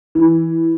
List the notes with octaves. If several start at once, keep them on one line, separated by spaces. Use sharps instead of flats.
E3